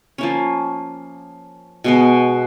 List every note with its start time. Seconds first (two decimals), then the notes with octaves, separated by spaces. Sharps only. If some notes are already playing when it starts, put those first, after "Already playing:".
0.18 F3 A#3 C#4
1.84 B2 G#3 B3